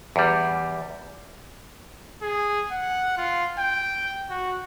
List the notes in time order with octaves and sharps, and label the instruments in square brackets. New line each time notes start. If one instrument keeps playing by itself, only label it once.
[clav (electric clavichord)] E2 G3
[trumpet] G#4
F#5
F4
G5
F#4